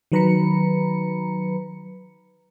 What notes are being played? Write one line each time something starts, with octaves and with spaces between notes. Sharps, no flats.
D#3 F#3 B4 A#5 B5 C#7